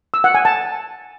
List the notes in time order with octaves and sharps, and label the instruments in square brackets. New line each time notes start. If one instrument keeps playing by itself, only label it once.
[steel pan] E6
F#5
G#5
A5